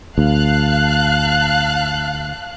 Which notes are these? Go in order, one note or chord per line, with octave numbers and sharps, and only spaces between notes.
D2 F5 A5 F#6